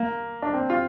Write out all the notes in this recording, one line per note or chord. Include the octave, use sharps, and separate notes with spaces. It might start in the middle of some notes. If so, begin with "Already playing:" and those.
Already playing: A#3
D4
C4
F4